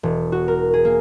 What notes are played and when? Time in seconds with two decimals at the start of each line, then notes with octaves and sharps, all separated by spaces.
0.03 E1
0.32 F#4
0.48 A#4
0.74 G#4
0.85 A#3